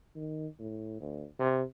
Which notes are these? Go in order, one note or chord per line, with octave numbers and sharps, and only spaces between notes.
D#3
A2
D2
C3